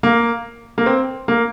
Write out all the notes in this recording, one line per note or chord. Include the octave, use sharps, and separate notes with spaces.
A#3
A#3
C4
A#3